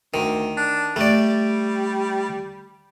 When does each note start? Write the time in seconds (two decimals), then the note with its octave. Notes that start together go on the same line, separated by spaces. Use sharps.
0.14 D2 D#3
0.57 D4
0.96 G3 A3 D5